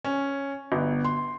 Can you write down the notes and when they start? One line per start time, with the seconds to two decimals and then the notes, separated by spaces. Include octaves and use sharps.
0.05 C#4
0.72 G1
1.04 C6